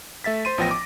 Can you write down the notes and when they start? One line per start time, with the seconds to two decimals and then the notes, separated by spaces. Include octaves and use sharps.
0.24 A3 E5 A6 B6
0.45 C5 C6 D#7
0.58 A1 F3 B3 G5 A#6
0.71 D6